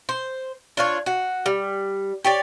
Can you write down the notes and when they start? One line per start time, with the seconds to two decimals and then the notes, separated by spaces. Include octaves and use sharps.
0.09 C5
0.77 D4 F4 C#5
1.06 F#4
1.46 G3
2.24 G4 C#5 D5